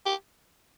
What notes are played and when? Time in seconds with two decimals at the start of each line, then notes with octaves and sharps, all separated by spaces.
0.06 G4